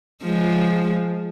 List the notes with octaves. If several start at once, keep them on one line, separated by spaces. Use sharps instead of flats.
F3 G#3